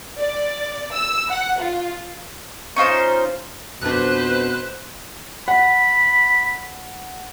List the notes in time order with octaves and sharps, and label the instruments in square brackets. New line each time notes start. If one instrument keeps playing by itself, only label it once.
[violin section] D5
E6
F#5
F4
[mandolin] C#4 D#4 F4 C5
[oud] F2 D4 [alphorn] B2 [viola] B4 C5 [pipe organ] F#6
[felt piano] F#5 [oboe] B5